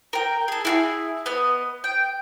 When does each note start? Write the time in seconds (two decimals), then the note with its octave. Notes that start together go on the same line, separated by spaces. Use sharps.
0.13 A#4 G5
0.48 G#4 A4
0.65 E4 F#4 G#4
1.26 B3 D#5
1.84 G5